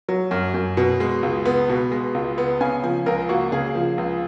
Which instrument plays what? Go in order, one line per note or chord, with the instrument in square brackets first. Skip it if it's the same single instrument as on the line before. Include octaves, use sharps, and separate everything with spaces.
[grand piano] F#3
F#2
F#2
B2
G#3
C#2
B3
B2
G#3
C#2
B3
C#3 G#5
F3 G#5
C#2 A#4
A#3 F#4
C#3 G#4
F3
C#2